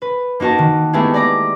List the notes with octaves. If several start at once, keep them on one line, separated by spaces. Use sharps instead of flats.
B4
A#3 D#4 F#4 A#4 A5
D#3
G#3 A3 B3 E4 G4 G#4
D5 A#5 D6